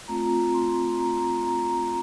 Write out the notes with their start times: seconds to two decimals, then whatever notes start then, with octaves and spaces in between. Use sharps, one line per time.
0.08 A3 C4 F4 A#5
0.54 C6
1.00 A#5
1.46 A#5